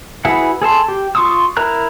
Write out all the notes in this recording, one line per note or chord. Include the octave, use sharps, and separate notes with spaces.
E4 F#4 G#4 B4 F#5
G#4 A4 A5 C6
G4
F4 C6 C#6 D#6 E6
E4 A#4 A#5 F#6